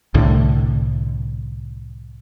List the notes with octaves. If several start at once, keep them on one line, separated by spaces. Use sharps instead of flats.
C2 A2 D3